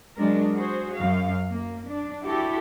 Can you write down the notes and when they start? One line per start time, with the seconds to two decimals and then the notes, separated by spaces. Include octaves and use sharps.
0.16 F#3 G#3 D4 A#4
0.53 F#4 G#4 C5
0.96 F#2 F5
1.50 A#3
1.88 D4
2.24 E4 F#4 G4 A4